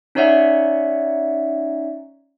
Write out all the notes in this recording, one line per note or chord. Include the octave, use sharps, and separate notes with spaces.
C#4 D#4 C#5 D5 E5 F#5